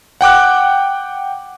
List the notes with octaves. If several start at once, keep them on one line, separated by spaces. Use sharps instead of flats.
F#5 G5 D6 F#6